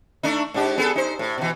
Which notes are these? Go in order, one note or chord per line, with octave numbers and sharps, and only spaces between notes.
A3 D4 D#4
G#2 D4 G4
B3 G#4 A4
D#4 C5
A2
B2 E3